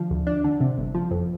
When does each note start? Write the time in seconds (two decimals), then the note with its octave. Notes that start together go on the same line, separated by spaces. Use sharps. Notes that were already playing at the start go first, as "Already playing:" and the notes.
Already playing: D3 F3
0.11 D2
0.27 D4
0.44 D3
0.61 C3
0.78 G1
0.95 F3
1.11 F2